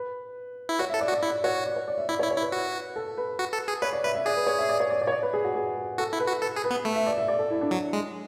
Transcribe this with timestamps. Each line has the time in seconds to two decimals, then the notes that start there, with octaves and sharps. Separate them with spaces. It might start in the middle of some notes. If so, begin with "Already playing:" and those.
Already playing: B4
0.69 E4
0.79 F#4 C#5
0.90 E5
0.94 A4
1.01 D5
1.08 F#4
1.12 D5
1.23 E4 D5
1.44 F#4 C#5
1.66 D5
1.76 C#5
1.88 D5
1.98 E5
2.09 E4 D5
2.19 C#5
2.23 E4
2.31 C#5
2.38 E4
2.42 B4
2.52 F#4
2.96 A4
3.17 B4
3.39 F#4
3.53 A4
3.68 G#4
3.82 B4 C#5
3.93 D5
4.04 B4 E5
4.14 E5
4.25 G#4 D5
4.36 B4
4.46 C#5
4.58 E5
4.69 D5
4.80 C#5
4.90 D5
5.01 D5
5.07 C#5
5.12 D5
5.23 B4
5.33 G#4
5.44 F#4
5.55 G#4
5.98 F#4 A4
6.13 E4
6.20 B4
6.27 F#4
6.42 A4 B4
6.56 G#4
6.64 B4
6.70 B3
6.85 A3
6.96 E5
7.07 D5
7.18 E5
7.28 D5
7.39 A4
7.50 E4
7.61 D4
7.71 F#3
7.93 G#3